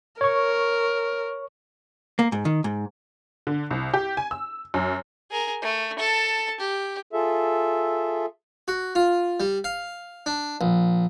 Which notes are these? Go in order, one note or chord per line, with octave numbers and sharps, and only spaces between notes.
A#4 C#5 C#6
A#3
G#2
D#3
G#2
D3
C2
G4
G#5
E6
F#2
G#4 A#4
A3
A4 A5
G4
F4 G#4 A4 E5
F#4
F4
G3
F5
D4
A#1